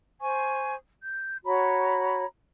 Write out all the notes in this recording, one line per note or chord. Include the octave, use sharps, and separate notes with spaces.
C5 G#5 C#6
G6
F#4 C#5 A#5 B5